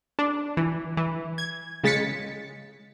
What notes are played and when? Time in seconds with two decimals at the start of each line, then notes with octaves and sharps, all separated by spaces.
0.19 D4
0.57 E3
0.97 E3
1.38 G#6
1.84 C#3 G#3 A6 B6 C#7